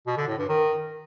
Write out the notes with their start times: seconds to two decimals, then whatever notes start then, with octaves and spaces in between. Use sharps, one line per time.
0.07 B2
0.17 D3
0.28 A2
0.38 G2
0.49 D#3